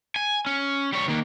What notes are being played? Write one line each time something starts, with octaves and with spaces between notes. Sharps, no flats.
G#5
C#4
G3 C#5
D#3 A#3